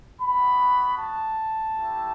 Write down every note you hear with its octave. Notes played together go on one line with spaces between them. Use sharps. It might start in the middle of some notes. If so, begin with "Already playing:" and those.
B3 F#4 B5
A5
A3 E4 G4